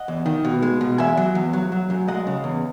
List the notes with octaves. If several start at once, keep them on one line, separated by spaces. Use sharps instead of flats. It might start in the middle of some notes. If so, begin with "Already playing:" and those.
Already playing: D#5 F#5
E2
D#3
B2
G#3
B2
E2 E5 G#5
F#3
E2
F#3
F#3
F#2
G#3 D#5 F#5
C#3
E2